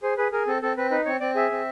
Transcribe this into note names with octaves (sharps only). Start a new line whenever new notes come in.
G#4 C5
G#4 B4
G#4 A#4
C4 A4
C4 A4
C4 B4
D#4 B4
C4 C#5
C4 D5
G#4 E5
C4